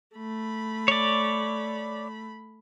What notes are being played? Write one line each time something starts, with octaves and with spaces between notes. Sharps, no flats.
A3 B5
C#5 D5